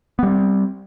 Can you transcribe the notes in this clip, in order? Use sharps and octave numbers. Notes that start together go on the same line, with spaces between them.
G3 B3 C4